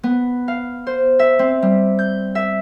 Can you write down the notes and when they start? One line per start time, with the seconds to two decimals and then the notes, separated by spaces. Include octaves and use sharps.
0.03 B3
0.48 F5
0.87 C5
1.19 E5
1.39 C4
1.62 G3
1.99 G6
2.35 E5